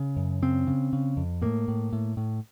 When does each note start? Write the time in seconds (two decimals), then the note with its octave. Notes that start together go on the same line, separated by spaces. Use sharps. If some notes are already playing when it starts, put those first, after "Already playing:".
Already playing: C#3
0.16 F#2
0.42 C#3 C4
0.67 C#3
0.93 C#3
1.17 F2
1.42 A2 A#3
1.68 A2
1.93 A2
2.17 A2